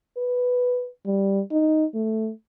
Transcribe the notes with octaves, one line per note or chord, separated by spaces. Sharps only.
B4
G3
D#4
A3